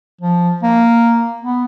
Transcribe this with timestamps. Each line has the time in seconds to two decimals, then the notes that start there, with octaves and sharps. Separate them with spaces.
0.21 F3
0.63 A#3
1.42 B3